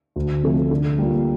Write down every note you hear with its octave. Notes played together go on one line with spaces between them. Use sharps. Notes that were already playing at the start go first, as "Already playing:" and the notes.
D2
C3 F3 A3
D3
G3 A#3 F4